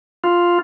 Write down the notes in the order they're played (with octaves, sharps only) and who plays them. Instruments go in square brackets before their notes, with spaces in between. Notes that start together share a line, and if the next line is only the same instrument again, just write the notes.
[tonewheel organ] F4